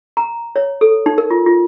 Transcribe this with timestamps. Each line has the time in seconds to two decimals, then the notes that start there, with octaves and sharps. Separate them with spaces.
0.17 A#5
0.56 C#5
0.81 A4
1.06 D#4
1.18 A#4
1.30 F4
1.46 F4